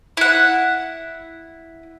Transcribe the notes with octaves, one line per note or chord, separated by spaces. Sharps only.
E4 F#5